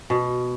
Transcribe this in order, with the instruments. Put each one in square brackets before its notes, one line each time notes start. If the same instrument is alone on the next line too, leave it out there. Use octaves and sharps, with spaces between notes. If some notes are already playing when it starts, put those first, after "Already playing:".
[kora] B2